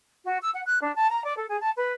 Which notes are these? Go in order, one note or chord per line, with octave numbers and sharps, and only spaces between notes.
F#4
E6
F#5
F#6
D4
A5
A#5
D5
A4
G#4
A5
B4